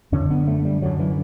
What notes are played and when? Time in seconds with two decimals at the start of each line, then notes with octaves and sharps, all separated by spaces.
0.12 F#2 D3 C#4
0.30 B3
0.47 A3
0.65 G3
0.82 F#2 D3 F#3
0.99 E3